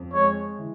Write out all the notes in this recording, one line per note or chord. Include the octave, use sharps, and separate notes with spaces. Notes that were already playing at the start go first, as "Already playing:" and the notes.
Already playing: F2
G#3 C#5
E3